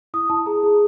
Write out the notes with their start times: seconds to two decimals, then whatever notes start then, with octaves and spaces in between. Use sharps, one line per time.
0.14 E4 D#6
0.30 E4 A5
0.46 G#4 A#5
0.63 G#4